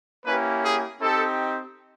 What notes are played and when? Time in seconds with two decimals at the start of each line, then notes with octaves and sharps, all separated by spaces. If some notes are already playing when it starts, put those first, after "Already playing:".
0.24 A#3 C#4 E4 G4 B4
0.62 G#4
0.99 C4 D#4 G4 A4